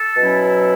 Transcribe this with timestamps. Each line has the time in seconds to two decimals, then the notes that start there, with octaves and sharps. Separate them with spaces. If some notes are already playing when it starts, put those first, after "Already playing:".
Already playing: A4
0.17 B2 F#3 C#4 E4